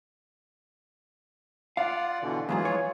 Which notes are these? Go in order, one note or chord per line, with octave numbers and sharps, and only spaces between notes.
F4 D5 F5 F#5
B2 D3 E3
E2 G#2 E3 F#3 F4 G#4
C#5